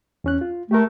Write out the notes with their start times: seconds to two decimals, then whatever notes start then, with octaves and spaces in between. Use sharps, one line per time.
0.24 E2 C#4 F#6
0.41 F4
0.71 A3 G4 A#4